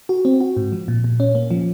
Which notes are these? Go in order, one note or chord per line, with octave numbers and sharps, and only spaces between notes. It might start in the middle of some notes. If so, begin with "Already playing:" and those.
F#4
C4
F#4
G#2
F3
A#2
A#2
C#4
A#3
F3